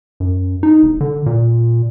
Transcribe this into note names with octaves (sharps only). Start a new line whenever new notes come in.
F#2
D#4
E1
D3
A#2